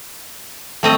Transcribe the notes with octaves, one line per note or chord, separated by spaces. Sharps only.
G3 A3 C4 D#5